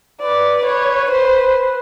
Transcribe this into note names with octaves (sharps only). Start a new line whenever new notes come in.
B4 D5
C#5
C5